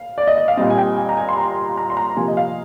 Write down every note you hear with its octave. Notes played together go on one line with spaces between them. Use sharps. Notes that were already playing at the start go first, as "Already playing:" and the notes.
Already playing: F5
D5
D#5
D#5
F5
A#2 G3 C4 D#5
G#5
G5
G#5
A#5
G#5
C6
A#5
A#5
C6
A#5
C3 F3 A#3 G#5
D#5
F5